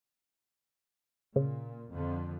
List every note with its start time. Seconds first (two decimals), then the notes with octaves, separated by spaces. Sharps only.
1.36 A#2 C#3
1.91 F2 D3